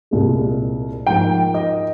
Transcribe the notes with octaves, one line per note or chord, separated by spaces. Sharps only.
C2 A#2 G#3
G#2 F3 A#3 G5
D#5